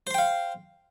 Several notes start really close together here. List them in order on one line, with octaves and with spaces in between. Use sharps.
C5 C6 G5 F5